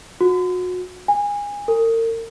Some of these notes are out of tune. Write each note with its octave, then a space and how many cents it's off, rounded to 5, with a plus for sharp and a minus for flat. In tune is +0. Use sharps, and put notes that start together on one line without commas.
F#4 -30
G#5 -25
A#4 -40